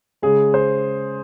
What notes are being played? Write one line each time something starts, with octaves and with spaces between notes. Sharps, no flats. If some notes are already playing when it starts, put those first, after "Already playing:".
C#3 G#3 G#4
C5